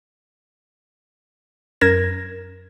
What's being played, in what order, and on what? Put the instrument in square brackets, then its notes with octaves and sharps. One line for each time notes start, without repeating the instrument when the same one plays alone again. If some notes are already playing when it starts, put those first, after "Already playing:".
[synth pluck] F#2 A#4 G#6 A#6 E7